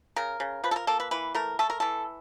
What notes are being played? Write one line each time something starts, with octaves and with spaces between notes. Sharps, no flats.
C#3 A#4
C#3
F3 B4
A4
A#4
A#3 A4
B4
E3 B4
A3 A#4
A3 A4
A#4
E3 A4